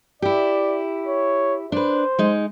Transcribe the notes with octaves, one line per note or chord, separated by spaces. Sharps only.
E4 G4 D5
C#5
D4 B4 C5
G#3 D#4